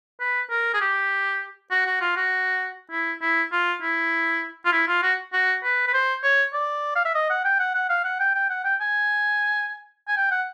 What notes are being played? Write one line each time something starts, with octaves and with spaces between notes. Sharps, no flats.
B4
A#4
G#4
G4
F#4
F#4
F4
F#4
E4
E4
F4
E4
F4
E4
F4
F#4
F#4
B4
B4
C5
C#5
D5
F5
E5
D#5
F#5
G5
F#5
F#5
F5
F#5
G5
G5
F#5
G5
G#5
G#5
G5
F#5